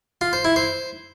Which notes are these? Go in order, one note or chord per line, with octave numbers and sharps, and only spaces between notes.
F4
C5
E4
C5